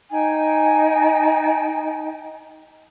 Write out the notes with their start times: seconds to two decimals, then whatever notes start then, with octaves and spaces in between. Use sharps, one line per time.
0.11 D#4 G5 G#5